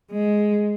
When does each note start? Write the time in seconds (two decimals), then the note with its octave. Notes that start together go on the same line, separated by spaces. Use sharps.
0.12 G#3